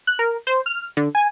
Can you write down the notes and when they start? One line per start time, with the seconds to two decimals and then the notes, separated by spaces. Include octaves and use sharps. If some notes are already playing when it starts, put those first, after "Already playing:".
0.07 F#6
0.19 A#4
0.47 C5
0.66 F6
0.97 D3
1.15 G#5